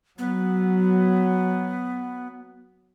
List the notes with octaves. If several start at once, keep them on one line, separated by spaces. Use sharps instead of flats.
F#3 B3